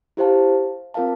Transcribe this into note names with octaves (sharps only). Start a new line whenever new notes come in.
E4 G4 C5 F5 A5
C4 F4 A#4 F5 A5